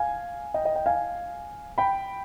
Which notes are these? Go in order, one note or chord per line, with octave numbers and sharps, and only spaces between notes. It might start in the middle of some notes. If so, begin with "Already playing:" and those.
Already playing: F5 G#5
D#5 G5
D#5 G5
D#5 G5
F5 G#5
G5 B5